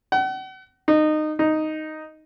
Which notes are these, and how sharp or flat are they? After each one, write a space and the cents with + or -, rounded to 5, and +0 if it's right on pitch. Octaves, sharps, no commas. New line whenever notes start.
F#5 +40
D#4 -20
D#4 +0